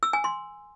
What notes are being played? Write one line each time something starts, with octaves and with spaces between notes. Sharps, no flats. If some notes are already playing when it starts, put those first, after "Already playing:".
E6
G#5
C6